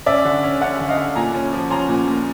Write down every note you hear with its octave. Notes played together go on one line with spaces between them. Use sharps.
C#4 D5 E5
D3
C#4
C#4 E5 F#5
D3
D#5 F5
D3
A#2 G#5 A#5
C#4
F3
C#4 A#5 C6
A#2
A#2